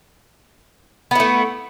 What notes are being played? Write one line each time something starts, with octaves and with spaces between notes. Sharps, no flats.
A3 B3 E4